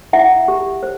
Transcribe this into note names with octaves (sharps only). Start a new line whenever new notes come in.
E4 E5 F#5
G4
C5